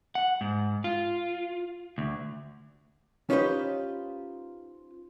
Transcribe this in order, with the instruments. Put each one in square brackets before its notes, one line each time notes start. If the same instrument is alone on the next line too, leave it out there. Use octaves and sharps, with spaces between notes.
[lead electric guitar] F#5
G#2
F4
D2
[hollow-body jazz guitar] C#4 D#4 F4 G4 B4 C5